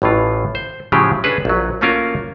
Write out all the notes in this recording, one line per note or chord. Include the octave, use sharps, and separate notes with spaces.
A1 A2 E3 F4
C5
A2 C#3 F3 F#3 G4 G#4
C#4 D4 G#4 A4 B4
A#1 F#3
A3 A#3 C#4 F4 F#4 A#4